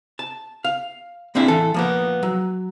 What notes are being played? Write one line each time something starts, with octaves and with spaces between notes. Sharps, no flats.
A5
F5
A#3 C4 D4 E4 G#4
E3 A4
F3 A#3 B3
F#3